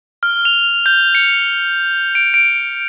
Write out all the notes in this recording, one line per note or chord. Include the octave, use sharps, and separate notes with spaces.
F6
F7
G6
C#7
D7
D7